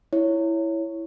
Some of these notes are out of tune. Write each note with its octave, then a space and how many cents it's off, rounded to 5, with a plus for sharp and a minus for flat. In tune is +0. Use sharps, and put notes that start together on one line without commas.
E4 +0 C#5 +0